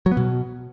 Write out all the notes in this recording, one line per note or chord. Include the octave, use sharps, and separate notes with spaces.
F#3
B3
B2